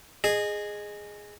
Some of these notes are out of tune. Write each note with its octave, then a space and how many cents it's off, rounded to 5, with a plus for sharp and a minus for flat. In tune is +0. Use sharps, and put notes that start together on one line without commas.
G#4 +0 D#5 -20